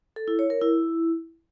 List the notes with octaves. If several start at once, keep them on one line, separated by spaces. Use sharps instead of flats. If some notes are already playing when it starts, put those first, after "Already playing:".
A4
E4
C#5
A#4
E4